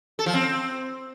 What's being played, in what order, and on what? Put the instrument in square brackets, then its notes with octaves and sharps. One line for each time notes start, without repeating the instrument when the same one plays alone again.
[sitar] A4
F3
C4